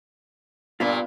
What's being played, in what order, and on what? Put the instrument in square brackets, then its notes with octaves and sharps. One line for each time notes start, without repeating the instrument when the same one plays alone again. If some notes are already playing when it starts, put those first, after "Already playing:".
[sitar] G2 A#2 A#3 [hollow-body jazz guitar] B3 F4